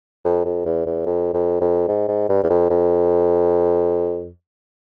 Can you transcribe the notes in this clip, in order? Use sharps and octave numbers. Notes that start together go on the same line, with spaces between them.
F2
F2
E2
E2
F2
F2
F2
G#2
G#2
G2
E2
F2
F2